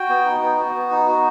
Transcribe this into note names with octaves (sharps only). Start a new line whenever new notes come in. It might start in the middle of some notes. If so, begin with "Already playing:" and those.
Already playing: F#4 G5
B3
D#4
B3
F#4
B3
D#4
F#4